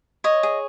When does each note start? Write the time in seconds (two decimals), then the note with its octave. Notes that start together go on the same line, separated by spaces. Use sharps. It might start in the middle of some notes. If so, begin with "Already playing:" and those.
0.24 C#5 D#5
0.43 G#4